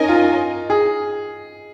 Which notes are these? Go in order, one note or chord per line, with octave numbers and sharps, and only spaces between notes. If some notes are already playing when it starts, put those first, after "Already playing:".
Already playing: C#4 D#4 A#4 D#5 G#5
F4
G#4